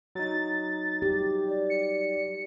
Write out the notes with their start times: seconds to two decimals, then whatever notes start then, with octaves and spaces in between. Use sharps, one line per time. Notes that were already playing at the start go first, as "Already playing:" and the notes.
0.15 F#3 D#4 A6
1.02 G4
1.48 D5
1.70 C#7